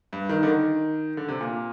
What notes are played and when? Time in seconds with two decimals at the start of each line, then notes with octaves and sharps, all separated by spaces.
0.13 G2
0.29 D#3
0.43 D3
0.47 D#3
1.17 D3
1.28 C3
1.41 A#2